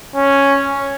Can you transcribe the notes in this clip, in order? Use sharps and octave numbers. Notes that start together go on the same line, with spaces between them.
C#4